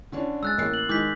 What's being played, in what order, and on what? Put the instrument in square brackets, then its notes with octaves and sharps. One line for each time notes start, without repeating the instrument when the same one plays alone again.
[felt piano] D3 C#4 D4
[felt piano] G#3 [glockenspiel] E6 F#6 A6
[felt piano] A1 A#3 C7
[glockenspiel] F#7
[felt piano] D#3 G#3 [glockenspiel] D6 G6 B6